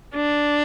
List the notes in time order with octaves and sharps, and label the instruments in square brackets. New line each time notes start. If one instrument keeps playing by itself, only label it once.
[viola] D4